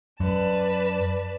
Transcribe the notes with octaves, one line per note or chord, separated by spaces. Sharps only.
F#2 B4 D5 A5